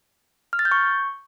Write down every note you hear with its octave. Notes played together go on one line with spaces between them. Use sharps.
F6
A6
G6
C#6